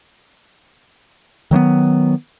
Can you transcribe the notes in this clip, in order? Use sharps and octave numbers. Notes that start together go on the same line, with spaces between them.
D#3 F#3 A#3 B3